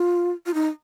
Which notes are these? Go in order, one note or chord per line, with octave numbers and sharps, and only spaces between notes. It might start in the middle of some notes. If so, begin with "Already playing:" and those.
Already playing: F4
F4
D#4